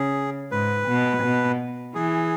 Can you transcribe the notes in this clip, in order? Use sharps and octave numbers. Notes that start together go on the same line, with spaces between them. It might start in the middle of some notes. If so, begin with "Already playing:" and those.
Already playing: C#3 G#4
G#2 B4
B2
B2
E3 G#4